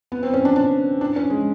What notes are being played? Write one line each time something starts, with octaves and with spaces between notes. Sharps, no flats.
B3
C4
C#4
D4
D4
D4
C#4
G#3